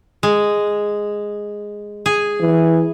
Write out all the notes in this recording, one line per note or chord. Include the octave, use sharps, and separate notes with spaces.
G#3
G#4
E3